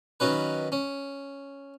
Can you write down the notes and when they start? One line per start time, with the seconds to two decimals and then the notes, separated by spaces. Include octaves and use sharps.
0.20 D#3 F#3 C#4 B4
0.72 C#4